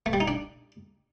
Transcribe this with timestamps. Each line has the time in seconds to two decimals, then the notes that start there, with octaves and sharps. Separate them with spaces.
0.06 A3
0.13 G3
0.20 D#4
0.28 D4